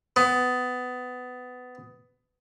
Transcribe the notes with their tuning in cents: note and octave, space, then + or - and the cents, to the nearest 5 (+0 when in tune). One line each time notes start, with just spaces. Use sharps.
B3 +20